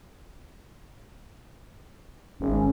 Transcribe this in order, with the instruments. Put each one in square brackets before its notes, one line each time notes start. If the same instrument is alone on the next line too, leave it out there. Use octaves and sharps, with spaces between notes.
[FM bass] G#1 [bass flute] C#4